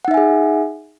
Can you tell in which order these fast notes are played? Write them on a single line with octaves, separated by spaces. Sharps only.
F#5 D#4 E5 G#5 G#4